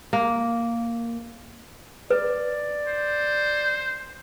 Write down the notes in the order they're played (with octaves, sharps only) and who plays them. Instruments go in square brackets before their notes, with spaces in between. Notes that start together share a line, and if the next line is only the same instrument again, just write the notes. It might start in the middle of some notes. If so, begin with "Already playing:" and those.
[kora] A#3
[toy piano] B4 [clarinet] D5
[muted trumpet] C5